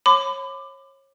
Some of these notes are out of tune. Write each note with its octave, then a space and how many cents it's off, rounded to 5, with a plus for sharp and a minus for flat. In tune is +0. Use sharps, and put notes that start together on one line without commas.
C#5 -30 B5 +35 D6 +15